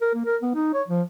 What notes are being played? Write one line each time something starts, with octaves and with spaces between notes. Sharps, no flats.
A#4
A#3
A#4
B3
D#4
C#5
F3